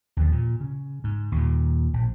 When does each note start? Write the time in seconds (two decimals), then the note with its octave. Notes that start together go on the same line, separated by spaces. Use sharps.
0.17 D#2 D3 F3
0.32 A#2
0.61 C#3
1.04 G#2
1.32 D#2 A#2
1.93 A#1